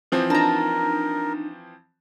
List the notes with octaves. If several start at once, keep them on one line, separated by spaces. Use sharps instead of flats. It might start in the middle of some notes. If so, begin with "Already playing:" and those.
E3 F3 C4
D4 D#4 A#4 A5 A#5